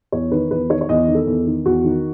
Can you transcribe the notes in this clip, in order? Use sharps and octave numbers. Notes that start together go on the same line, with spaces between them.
E2 C#5
D#3 B4
E2 B4
D#3 C#5
C#5
E2 D#5
D#3
A4
E2
D#3
E2 F#4
D#3